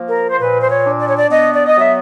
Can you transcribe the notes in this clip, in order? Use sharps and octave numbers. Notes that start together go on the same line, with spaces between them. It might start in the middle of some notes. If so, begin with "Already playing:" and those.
Already playing: F3 A#3
A#4
C5
A#2 B4
C5
C#5
D4
D5
C#5
D5
B3 D#5
D5
D#5
F#3 E5